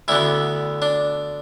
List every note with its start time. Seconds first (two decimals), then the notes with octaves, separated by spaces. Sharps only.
0.08 D2 D3 B3 D4 E4
0.82 D4